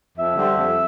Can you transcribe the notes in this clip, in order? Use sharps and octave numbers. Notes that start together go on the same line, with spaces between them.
F2 E5
D3 G3 C4
F2